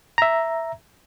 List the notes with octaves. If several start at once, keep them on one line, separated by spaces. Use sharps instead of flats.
E5 A#5